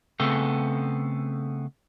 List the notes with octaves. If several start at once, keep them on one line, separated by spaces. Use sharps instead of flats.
C#3 A3 B3 C4 A4